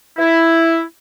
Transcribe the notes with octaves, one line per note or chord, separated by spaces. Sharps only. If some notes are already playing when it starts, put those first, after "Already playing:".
E4